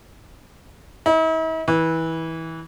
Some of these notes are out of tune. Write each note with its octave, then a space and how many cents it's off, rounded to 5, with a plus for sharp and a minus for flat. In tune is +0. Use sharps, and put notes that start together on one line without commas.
E4 -45
E3 -20